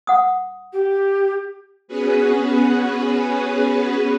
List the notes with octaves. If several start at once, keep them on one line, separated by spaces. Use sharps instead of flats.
F#5 D#6
G4
B3 C#4 F#4 G#4 B4